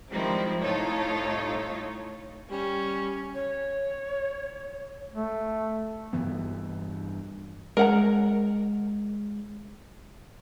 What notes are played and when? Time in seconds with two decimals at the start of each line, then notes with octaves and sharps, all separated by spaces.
0.11 G#2 D#3 F3 G3 C4 E4
0.62 C2 A2 D#4 F4 A4 C#5
2.51 G3 C#4
3.34 C#5
5.13 A3
6.13 G2 E3 B3
7.77 G#3 A#4 F#5 A#5